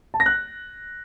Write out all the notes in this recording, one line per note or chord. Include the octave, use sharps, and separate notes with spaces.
A5
A#6
F#6